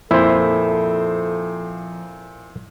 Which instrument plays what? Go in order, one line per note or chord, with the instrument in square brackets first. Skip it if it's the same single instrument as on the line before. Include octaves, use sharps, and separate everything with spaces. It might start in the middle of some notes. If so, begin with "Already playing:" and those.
[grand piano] F2 [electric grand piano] A#2 C5 [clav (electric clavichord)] E4 [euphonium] A4